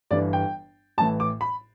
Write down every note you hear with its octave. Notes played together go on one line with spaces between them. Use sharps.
G1 G2 E3 D5
G5
A1 A2 E3 A5
D6
B5